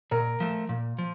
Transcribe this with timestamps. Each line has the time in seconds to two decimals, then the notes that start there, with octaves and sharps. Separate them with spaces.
0.11 A#2 A#4
0.40 F3 A3
0.69 A#2
0.99 F3